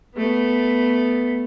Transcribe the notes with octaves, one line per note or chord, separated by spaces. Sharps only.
A3 B3